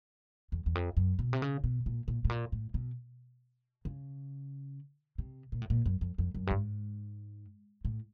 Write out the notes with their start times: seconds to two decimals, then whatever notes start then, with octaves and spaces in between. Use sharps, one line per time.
0.52 E2
0.66 E2
0.75 F2
0.97 F#2
1.19 B2
1.33 C3
1.42 C#3
1.64 B2
1.86 A#2
2.08 A#2
2.25 A2
2.30 A#2
2.52 A2
2.74 B2
3.85 C#3
5.18 C3
5.52 A#2
5.62 A2
5.70 A#2
5.86 F#2
6.01 F2
6.18 F2
6.34 F#2
6.47 G2
6.51 G#2
7.85 A2